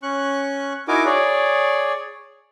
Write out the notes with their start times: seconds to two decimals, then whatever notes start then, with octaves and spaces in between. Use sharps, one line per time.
0.03 C#4 C#6 F#6
0.88 D#4 E4 F#4 A#4 G#5 D6
1.05 G#4 C#5 D5